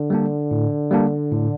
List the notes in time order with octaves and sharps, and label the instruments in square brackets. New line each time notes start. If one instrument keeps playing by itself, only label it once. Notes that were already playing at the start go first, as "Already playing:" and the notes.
Already playing: [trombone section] D3
[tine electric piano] G3 A#3 D4
A2
G3 A#3 D4
A2